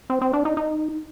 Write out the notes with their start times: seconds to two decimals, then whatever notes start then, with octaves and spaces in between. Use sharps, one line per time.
0.10 C4
0.22 C4
0.33 D4
0.45 D#4
0.57 D#4